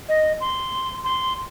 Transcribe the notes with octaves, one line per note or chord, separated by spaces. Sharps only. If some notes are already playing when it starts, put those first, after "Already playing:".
D#5
C6
C6